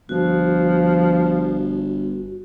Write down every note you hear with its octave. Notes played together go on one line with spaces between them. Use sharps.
G1 F3 F#4